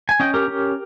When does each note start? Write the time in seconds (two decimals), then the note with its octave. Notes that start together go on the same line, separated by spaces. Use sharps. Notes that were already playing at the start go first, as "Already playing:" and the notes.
0.09 G#5
0.20 C#4 D#5 G5
0.34 G4 A#4
0.48 C#4